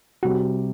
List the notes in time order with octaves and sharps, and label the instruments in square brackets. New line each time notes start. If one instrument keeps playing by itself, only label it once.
[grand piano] C3 G3 [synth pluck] F#4